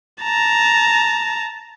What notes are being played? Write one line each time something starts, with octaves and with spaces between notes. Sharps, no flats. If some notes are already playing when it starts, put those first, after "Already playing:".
A5 A#5